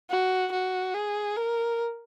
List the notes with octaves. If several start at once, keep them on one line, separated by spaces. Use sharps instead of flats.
F#4
F#4
G#4
A#4